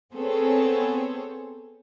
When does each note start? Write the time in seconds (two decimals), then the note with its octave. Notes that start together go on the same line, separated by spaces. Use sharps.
0.13 B3 C4 G#4 A4 C#5